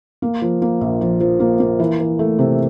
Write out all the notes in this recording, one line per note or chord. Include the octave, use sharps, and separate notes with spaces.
A#3
F3
A#3
A#1
F3
F3
A#3
A#3
E3
E3
A3
C3